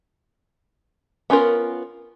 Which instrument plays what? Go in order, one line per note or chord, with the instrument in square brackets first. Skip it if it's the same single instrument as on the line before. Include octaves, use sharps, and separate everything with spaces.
[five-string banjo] B3 C#4 D4 F4 A#4